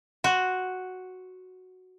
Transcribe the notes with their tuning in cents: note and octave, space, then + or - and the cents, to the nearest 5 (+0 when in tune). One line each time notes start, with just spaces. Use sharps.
F#4 +0 C5 +5